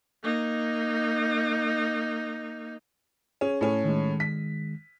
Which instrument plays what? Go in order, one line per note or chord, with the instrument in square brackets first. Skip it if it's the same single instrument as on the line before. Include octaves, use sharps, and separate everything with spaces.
[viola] A#3 D#4
[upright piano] C#4 [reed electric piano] G#4
[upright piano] A2 C#4
[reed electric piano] D#3 G#3
[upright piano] B6